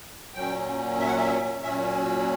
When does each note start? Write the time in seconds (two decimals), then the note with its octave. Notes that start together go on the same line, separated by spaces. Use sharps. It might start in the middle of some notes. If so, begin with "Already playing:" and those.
0.34 A#2 F#3 C#4 G5
0.99 E5
1.07 F#5
1.17 E5
1.63 A#2 F#3 C#4 E5